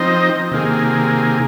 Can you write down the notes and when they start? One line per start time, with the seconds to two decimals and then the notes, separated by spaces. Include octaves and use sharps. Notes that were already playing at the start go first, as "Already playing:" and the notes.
Already playing: F3 C4 D#4 C5 D#5
0.51 C3 D#3 A#3 G#4